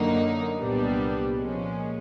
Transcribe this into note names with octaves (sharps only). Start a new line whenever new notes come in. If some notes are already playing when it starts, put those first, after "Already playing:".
Already playing: F#2 D3 F#3 A#3 D#4
C2 A#2 G3 B3 D4
A#2 F3 G#3 C#4